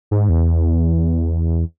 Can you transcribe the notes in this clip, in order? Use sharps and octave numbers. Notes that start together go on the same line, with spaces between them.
G#2
E2